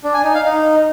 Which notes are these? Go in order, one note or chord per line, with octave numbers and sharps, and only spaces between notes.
D4
G#5
D#4
F5
D#4